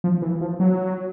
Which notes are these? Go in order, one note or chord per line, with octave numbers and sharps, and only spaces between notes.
F3
E3
F3
F#3